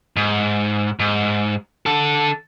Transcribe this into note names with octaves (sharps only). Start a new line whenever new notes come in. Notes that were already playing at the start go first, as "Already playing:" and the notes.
G#2
G#2
D3 A4